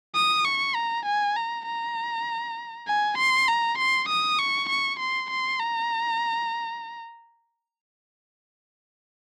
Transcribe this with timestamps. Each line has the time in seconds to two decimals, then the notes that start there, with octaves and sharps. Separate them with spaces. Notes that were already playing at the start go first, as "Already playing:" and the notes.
0.15 D#6
0.45 C#6
0.75 A#5
1.06 G#5
1.36 A#5
1.66 A#5
2.87 G#5
3.18 C6
3.48 A#5
3.78 C6
4.09 D#6
4.39 C#6
4.69 C#6
4.99 C6
5.30 C6
5.60 A#5